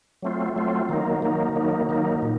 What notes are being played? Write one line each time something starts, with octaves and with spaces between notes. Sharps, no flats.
F#3 A3 C4 F4
F#3 A3 C4 F4
D#3 F#3 A#3 D#4
D#3 F#3 A#3 D#4
D#3 F#3 A#3 D#4
D#3 F#3 A#3 D#4
A#2